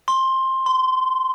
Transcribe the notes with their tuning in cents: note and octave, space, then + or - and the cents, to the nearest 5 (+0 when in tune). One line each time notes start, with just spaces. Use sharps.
C6 +15
C6 -20